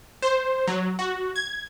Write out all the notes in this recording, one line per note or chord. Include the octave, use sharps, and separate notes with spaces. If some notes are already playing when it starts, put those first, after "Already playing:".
C5
F#3
F#4
G#6